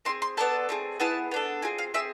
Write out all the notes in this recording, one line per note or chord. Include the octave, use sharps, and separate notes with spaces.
C4 E4 G#4 C6
C6
B3 D4 A4 A5
A3 C4 G#4
B3 E4 G#4 A5
B3 D4 A4
C4 F4 G#4 G#5
F5
C4 G#4 E5